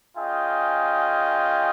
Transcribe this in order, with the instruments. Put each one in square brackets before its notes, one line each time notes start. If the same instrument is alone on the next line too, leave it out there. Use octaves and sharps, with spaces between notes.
[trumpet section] C#4 F4 G#4 D#5 G5